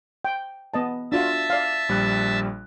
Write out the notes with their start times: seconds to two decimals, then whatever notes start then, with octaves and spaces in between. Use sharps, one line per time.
0.25 G5
0.74 B3 D#5 A5
1.12 D4 F4 F#4 E5 A5 E6
1.50 D5 F5
1.89 A#1 G3 F#6